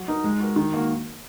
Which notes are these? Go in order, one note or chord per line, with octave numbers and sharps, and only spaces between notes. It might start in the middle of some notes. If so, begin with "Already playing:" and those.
Already playing: F#3
D#4 A#4
G#3
F#4 A#4
D#3
A#3 F#4